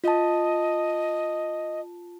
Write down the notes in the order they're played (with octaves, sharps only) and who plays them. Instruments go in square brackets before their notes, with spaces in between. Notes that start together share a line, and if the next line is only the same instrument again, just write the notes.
[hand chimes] F4 A5 [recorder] D#5